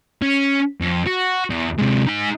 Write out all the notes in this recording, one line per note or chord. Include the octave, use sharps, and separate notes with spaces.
C#4
F2
F#4
E2
C3 G#3
D#4 G#5